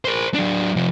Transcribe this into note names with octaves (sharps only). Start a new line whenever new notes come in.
A#4 C5
F#3 D4
C3 F3